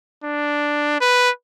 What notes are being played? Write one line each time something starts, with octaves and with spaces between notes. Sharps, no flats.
D4
B4